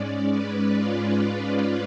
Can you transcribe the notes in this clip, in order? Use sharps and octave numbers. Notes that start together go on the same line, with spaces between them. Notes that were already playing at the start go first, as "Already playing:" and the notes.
Already playing: G#2 G#3 C#4 D5
B4
F4